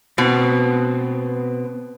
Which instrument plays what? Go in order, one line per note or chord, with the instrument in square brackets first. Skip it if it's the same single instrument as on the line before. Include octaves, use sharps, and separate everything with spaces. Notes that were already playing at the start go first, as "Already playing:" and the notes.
[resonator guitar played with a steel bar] B2 [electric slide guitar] B3 C4